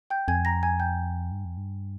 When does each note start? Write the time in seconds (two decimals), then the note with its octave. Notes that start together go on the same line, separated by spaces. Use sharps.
0.10 G5 G6
0.28 F2 G#5 G#6
0.45 A#5 A#6
0.63 G#5 G#6
0.80 G5 G6
1.31 G2
1.45 F2
1.57 G2